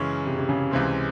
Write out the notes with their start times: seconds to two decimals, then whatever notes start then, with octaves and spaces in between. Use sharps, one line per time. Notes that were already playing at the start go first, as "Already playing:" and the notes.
Already playing: F#2 C#3 E3 G#3 C#4
0.26 C3
0.39 C3
0.49 C#3
0.71 C#2 C3 E3 G#3 C4